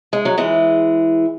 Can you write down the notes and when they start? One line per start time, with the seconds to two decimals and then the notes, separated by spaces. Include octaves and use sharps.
0.13 G#3
0.25 F#3
0.38 E3 G#3